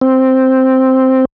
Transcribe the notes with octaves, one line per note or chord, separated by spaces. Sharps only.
C4